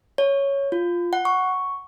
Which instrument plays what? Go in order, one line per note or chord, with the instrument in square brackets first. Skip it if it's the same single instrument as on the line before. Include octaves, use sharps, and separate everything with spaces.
[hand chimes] C#5
F4
F#5
C#6